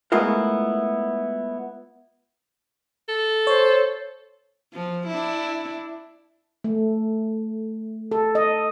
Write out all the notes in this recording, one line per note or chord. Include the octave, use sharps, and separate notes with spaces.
G#3 A3 B3 E4 F4 A#4
A4
C5 C#5
F3
D4 E4
A3
A4
D#5